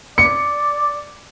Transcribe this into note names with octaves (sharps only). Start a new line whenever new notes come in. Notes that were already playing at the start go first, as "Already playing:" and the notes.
D5 C#7